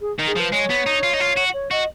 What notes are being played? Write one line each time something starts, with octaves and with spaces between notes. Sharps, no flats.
G#4
D#3
G#4
F3 B4
G#3 C#5
B3
D#4
F4
D#4
F4
F#4
C#5
F#4 D#5